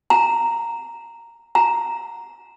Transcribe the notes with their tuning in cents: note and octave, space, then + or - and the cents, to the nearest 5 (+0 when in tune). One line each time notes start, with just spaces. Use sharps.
A#5 -10
A#5 -5